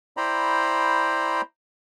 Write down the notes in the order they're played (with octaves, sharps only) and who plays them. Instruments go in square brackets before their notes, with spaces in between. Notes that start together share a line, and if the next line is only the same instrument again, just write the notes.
[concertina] E4 C5 D5 G5 A#5 B5